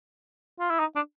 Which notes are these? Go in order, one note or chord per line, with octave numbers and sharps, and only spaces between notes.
F4
E4
D#4
D4